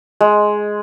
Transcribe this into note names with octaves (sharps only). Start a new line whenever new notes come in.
G#3